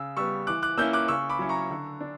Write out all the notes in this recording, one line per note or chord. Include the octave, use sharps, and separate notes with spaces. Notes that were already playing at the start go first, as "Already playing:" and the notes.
Already playing: C#3 E6
G3 B3 C#6 E6
E3 D6 F#6
D6 F#6
A#3 C#4 E4 E6 G6
D6 F#6
C#3 C#6 E6
B5 D6
F#3 C#4 E4
A#5 C#6
D3
D4